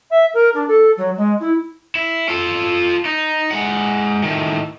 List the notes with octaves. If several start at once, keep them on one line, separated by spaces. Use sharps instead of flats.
E5
A#4
D4
A4
F#3
G#3
E4
E4
F4 A4
D#4
G#3 F#5
A2 D#3